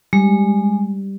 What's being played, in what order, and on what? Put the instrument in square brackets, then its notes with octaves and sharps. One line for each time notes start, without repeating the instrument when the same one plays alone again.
[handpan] G3 [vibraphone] G#3